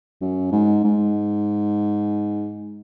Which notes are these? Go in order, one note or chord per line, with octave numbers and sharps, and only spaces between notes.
F#2
G#2
G#2